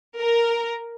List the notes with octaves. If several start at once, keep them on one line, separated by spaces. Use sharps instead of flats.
A#4